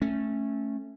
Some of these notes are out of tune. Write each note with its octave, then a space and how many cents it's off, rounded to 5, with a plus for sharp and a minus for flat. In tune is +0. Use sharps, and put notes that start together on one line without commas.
A3 +0 C#4 -15